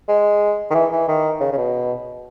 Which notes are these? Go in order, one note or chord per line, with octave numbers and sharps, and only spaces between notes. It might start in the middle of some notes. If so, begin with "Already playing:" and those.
G#3
D#3
E3
E3
D#3
C#3
C#3
B2